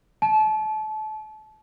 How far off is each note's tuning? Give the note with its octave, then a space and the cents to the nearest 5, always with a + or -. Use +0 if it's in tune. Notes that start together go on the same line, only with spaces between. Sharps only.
A5 -30